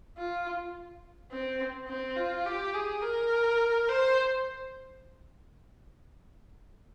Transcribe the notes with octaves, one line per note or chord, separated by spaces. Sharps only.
F4
C4
C4
F4
G4
G#4
A#4
C5